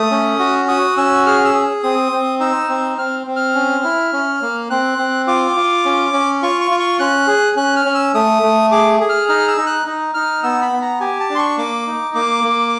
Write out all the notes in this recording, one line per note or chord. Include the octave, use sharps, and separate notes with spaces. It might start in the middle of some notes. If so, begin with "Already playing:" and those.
Already playing: A3 D#6
C#4
F#4
F#4 D#6
C#4 E6
G#4 F6
E6
G#4
C4 D#6
C4
D#4 E6
C4
C4 F6
C4
F6
C#4
E4
C#4
A#3
C4 F#6
C4
F4 D6
F4
C#4
C#4
F4 C#6
C#6
F4
C#6
C#4 F#6
G#4
C#4 F#6
F6
C#4
E6
A3 D#6
A3
G#4 D6
G#4
F6
D#4 F6
E6
D#4
F#6
D#4
D#4 F6
B3 E6
B5
B3
A#5
G4 G#5
A5
D4
C6
C#6
A#3 D6
D#4
A#3 D6
A#3